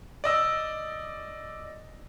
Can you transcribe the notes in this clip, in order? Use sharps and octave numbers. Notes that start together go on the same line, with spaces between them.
D5 D#5 E6